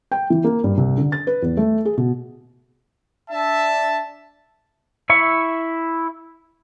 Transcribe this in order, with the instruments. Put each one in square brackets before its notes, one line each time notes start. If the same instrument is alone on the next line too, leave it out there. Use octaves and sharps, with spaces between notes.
[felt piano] G5
E3
A#3
G2
C2
D3
A6
B4
E2
A3
G#4
B2
[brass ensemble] D4 E5 A5
[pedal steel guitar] E4 E5 C#6